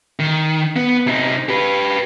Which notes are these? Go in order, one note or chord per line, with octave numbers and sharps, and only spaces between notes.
D#3
B3
C3 D#4
G4 B4